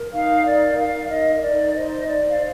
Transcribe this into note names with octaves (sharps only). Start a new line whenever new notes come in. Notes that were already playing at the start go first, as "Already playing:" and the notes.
Already playing: A#4
D#4 F5
A#4 D5
A#4 F5
D#4 D#5
D#5
D#4 D5
C5 D#5
C5 D5
F5